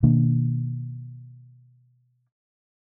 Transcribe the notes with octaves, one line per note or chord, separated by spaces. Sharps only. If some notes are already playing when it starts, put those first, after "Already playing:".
B2 D#3 A#3 D4